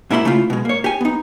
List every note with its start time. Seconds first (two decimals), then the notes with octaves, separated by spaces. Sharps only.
0.11 G#2 A#3 E4 A#4 B5 C6
0.25 C#3 A3 E4 F4
0.50 B2 G#3
0.65 A#3 C#5
0.84 G4 G#5
1.01 B3 D#4